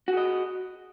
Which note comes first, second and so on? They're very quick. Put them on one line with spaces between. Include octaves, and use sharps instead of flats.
F#4 G#4 D#5